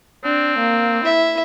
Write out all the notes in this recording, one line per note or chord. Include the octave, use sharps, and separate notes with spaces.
C4 D4
A#3
E4 E5